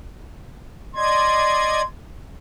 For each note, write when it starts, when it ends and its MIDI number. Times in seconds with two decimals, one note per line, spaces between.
0.96 1.82 74
0.96 1.82 75
0.96 1.84 84
0.96 1.82 92